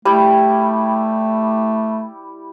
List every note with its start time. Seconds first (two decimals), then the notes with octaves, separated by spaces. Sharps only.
0.05 G3 A3 E4 G4